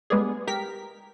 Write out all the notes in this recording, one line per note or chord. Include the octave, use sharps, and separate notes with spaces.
G3 G#3 B3 D4 G#4
G4 A#4 B6